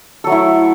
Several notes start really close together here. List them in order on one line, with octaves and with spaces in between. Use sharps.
A4 F#3 A3 E4